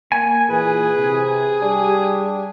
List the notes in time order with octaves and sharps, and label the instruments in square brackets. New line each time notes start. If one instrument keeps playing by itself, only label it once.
[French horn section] A#3 [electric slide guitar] G#5
[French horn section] A#2 E3 [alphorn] G#4 [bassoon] B4
[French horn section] C3
[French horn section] G3 G4 [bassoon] D4